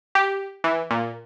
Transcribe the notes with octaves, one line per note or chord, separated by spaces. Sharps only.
G4
E3
A#2